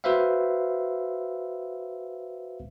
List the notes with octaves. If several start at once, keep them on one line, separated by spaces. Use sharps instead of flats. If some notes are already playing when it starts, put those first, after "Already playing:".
F#4 B4 C5 E5 F5